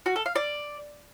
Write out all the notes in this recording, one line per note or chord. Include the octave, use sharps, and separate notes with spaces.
F#4
A4
F5
D5